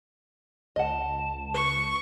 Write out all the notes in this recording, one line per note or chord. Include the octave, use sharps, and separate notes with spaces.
C#2 D#5 F#5 A5
B4 C#6